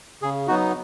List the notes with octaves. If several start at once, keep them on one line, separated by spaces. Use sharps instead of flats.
C#3 G#4
F#3 B3 D#4 F#4